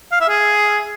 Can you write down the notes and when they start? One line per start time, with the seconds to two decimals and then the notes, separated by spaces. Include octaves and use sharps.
0.12 F5
0.20 E5
0.29 G#4